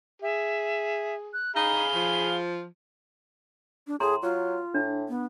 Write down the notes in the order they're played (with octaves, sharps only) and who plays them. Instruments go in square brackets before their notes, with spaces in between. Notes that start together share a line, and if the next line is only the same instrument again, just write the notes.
[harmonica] G#4 [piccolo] E5
[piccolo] F#6
[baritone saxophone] D#4 [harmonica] G#4 F5 B5 [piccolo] G7
[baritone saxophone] F3
[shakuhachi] D4
[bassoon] A2 [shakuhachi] G#4 [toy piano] A#5 C6
[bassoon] F#3 [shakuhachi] F4
[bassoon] A2 [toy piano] D4
[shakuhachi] B3